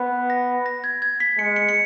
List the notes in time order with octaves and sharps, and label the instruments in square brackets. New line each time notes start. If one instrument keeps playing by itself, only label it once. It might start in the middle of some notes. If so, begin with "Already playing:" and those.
Already playing: [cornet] B3
[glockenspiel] A#6
A#6
G#6
G#6
B6
[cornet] G#3 [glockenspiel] C#7
[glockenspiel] C#7
C#7